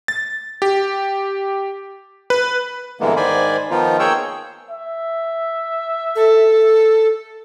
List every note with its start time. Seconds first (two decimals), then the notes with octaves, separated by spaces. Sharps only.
0.08 A6
0.62 G4
2.30 B4
3.01 G2 D3 E3 G#3 A#3 B3
3.17 G#2 D#3 C5 D5 G#5 B5
3.71 D#3 F3 B3 D#4 F4
3.99 A#3 G#4 C#5 G5 E6
4.70 E5
6.16 A4